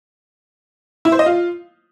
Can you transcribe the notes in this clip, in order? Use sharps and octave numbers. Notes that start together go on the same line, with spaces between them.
E4
C5
D#5
F4